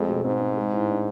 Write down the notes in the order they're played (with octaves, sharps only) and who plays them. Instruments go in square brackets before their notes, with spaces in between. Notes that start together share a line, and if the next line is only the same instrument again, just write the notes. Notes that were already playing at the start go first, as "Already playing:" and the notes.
Already playing: [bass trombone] F2 [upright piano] G#3 A3
[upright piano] B2
[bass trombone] G#2 [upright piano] C4
[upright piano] C4
G#3
A2
D4